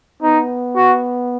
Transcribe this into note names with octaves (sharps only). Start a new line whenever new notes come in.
B3 D#4
F#4